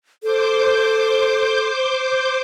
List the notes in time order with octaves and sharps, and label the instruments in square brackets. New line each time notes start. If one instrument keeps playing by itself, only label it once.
[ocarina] A4 [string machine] C5 D6 G6